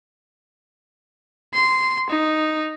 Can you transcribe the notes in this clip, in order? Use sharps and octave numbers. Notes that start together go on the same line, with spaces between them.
C6
D#4